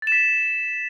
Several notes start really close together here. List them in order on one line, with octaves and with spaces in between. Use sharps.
A6 E7 B6